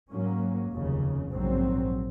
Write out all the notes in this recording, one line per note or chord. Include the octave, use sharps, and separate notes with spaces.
G#2 F#3 A#3 C#4
F1 D#2 C#3
A#1 G#2 F#3 C4